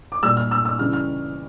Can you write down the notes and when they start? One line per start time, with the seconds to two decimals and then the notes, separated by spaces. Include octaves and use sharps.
0.12 D6
0.23 A#2 G3 E6
0.37 F6
0.51 E6
0.65 E6
0.79 C#3 E3 G3 F6
0.93 F6